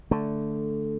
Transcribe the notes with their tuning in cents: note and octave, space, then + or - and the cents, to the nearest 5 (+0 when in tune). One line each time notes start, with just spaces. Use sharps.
D3 +0 A3 +0